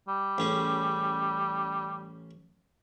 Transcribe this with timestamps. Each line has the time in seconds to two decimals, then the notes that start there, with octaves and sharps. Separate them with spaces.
0.08 G3
0.38 A1 C#4 G#4